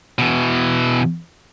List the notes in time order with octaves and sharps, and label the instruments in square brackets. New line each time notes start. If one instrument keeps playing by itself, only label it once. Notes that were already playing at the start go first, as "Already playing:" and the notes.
[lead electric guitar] B2 E3